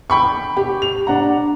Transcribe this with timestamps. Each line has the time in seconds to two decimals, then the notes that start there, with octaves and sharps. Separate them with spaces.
0.10 G5 B5 C#6
0.57 G4
0.82 F7
1.07 D4 F#5 A#5